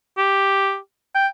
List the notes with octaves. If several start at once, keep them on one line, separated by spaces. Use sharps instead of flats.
G4
G5